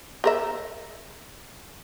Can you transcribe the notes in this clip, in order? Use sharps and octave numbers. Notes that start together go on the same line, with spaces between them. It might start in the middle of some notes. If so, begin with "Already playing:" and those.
G4 A#4 E5